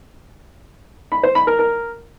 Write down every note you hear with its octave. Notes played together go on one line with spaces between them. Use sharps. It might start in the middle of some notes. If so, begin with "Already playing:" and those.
B5
C5
B5
A#4
A#4